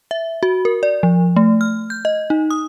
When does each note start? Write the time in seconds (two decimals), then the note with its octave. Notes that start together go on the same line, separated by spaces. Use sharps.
0.11 E5
0.43 F#4
0.65 A#4
0.83 D5
1.03 F3
1.36 A3
1.61 F6
1.90 G6
2.05 D#5
2.30 D#4
2.51 D#6